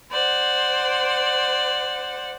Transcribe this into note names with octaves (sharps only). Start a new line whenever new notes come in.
C5 D5 F#5